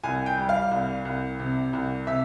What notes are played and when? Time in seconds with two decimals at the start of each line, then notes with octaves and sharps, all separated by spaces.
0.03 C2 G#5
0.26 G5
0.37 G3
0.49 F5
0.71 C2
1.05 C2
1.40 C3
1.73 C2
2.07 C3 E5